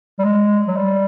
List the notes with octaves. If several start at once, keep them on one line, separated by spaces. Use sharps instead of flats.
G3
G#3
F#3
G3